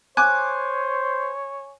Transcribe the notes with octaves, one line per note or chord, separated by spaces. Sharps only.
C5 C#5 G#5 D6 F#6